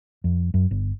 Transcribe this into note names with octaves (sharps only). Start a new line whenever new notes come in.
F2
F#2
G1